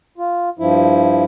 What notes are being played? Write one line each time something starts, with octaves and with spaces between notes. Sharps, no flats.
F4
G2 F3 E4